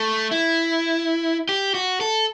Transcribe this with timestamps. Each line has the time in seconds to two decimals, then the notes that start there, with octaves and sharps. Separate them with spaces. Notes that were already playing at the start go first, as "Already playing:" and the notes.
Already playing: A3
0.31 E4
1.49 G4
1.74 F#4
2.01 A4